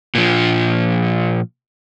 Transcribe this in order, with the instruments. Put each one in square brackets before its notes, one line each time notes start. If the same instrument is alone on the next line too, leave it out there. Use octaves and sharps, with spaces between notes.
[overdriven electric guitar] A#2 F3